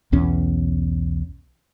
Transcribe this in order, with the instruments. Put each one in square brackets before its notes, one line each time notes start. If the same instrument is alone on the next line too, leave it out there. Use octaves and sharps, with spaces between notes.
[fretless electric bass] B1 E2 C#4